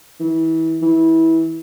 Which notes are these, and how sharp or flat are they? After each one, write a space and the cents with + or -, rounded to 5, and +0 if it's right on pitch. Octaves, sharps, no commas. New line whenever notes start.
E3 -30
E3 -20